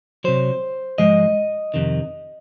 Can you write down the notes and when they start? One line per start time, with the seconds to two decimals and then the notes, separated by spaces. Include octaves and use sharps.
0.24 C3 F#3 C5
0.98 G#2 F3 G#3 D#5
1.74 F2 C3 D#3